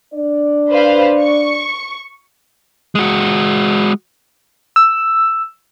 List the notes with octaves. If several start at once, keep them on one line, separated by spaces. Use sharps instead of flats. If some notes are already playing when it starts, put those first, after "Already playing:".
D4 D5
B4 C5 F5
C#6
G#3 F#4
E6